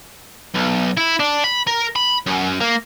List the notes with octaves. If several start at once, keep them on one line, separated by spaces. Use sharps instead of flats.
B1
E4
D4
B5
A#4
B5
F#2
A#3